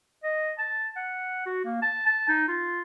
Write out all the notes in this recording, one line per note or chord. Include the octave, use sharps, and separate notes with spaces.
D#5
A5
F#5
F#4
A#3
A5
A5
D#4
F4